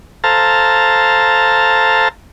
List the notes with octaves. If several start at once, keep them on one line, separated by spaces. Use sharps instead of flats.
A4 C5 F5 A5 A#5